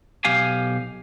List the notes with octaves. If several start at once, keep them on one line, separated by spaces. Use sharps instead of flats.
B1 G4 F5 G#5